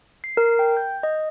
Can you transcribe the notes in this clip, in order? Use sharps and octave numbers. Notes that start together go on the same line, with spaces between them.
C7
A#4
G5
G6
D#5